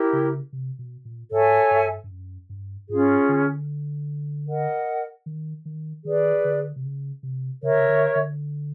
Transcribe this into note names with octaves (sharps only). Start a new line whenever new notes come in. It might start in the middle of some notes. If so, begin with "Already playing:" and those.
Already playing: E4 G4 A#4
C#3
C3
B2
A#2
G#2 A4 C#5 E5 G#5
G2
G2
F#2
G2
G#2 C#4 F4 G#4
D3
A#4 D#5 F#5
D#3
D#3
D#3 G#4 B4 D5
D3
C3
C#3
C3
C#3 A#4 C#5 E5
D3
C#3
D3
D3